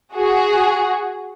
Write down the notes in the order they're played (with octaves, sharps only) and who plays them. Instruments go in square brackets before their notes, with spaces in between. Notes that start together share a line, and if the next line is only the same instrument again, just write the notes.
[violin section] F#4 G#4